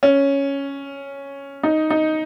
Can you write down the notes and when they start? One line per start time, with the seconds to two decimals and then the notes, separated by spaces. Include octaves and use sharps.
0.03 C#4
1.63 D#4
1.90 D#4